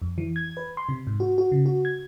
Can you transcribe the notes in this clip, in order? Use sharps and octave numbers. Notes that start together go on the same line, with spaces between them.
F2
E3
G#6
B4
C6
C3
G#2
F#4
F#4
C#3
F#4
G#6